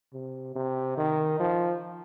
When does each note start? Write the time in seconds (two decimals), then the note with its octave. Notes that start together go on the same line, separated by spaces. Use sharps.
0.14 C3
0.55 C3
0.97 D#3
1.39 F3